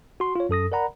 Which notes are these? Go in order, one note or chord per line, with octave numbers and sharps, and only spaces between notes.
F#4 C6
F4 C#5
F#2 A4 D#6 A#6
A#4 D5 F#5 A#5 B5